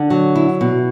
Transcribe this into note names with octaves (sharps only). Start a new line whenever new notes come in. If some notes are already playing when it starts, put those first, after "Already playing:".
Already playing: D3
F#3
E4
B2